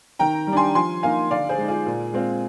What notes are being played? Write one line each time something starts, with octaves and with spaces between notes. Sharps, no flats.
D#3 G5 A#5
G3
D4 G#5 C6
F3 G#5 C6
A#3 D#4 F5 G#5
D3 D5 F5
G#4 C5
G#3 D#4
F4 G#4
A#2
G#3 C4 F4